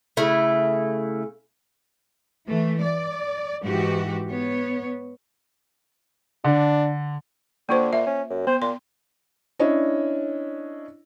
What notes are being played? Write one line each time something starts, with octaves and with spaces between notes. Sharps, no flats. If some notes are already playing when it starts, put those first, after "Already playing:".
C#3 A3 E4
E3 A3
D5
G#2 E3 F#4 G4
B3 C#5
D3 D4
D3 A#3 F4 C5
A#2 E5
C#4
F#2
B3 C5
A#2 C6
C#4 D4 E4 C#5 D#5